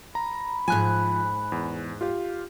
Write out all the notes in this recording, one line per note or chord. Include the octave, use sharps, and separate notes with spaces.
A#5 B5
G#2 F3 G#5 F#6
E2
F4 G4 F5